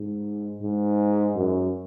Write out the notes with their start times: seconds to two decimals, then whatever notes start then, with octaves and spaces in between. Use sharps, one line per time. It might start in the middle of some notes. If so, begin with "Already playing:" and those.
Already playing: G#2
0.62 G#2
1.36 F#2